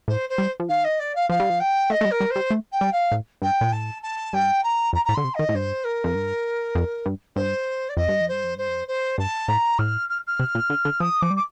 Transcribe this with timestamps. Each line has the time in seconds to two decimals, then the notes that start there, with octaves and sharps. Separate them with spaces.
0.08 A2 C5
0.29 C5
0.38 G3
0.60 F3
0.68 D#3 F5
0.84 D#5
0.99 D5
1.15 F5
1.29 F3 F5
1.40 G3
1.50 F3
1.60 G5
1.90 A3 D#5
2.01 A3
2.05 G3
2.11 A#4
2.20 G3
2.30 C5
2.36 G3
2.51 A3
2.72 G5
2.81 G3
2.92 F5
3.12 A2
3.42 G2 G5
3.61 A#2
3.72 A2 A5
4.02 A5
4.33 G2 G5
4.63 A#5
4.93 F2 A#5
5.05 A2 A#5
5.14 D3 C6
5.24 C3
5.34 D#5
5.39 D#3
5.49 A2
5.54 G2 C5
5.84 A#4
6.04 F2
6.15 G2
6.75 F2
7.06 G2
7.36 G2 C5
7.89 D5
7.96 F2 D#5
8.09 G2
8.21 F2
8.28 G2 C5
8.44 F2
8.56 G2 C5
8.68 F2
8.88 C5
9.18 G2 A5
9.48 A2 A#5
9.78 A2 F6
10.09 F6
10.27 F6
10.40 C3
10.55 A#2
10.70 D3
10.85 D3
11.00 F3 D#6
11.21 F3 D6
11.31 G3
11.36 D6